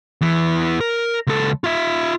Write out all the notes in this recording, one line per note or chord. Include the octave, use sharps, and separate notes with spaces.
E2 E3
A#4
C#2 A4
F4 E5